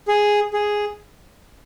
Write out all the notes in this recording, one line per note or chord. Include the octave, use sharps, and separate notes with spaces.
G#4
G#4